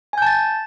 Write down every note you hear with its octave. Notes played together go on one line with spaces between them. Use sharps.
G#5 A5 G6 A6